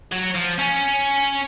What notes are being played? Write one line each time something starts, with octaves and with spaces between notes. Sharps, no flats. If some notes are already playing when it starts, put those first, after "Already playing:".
F#3
F3
C#4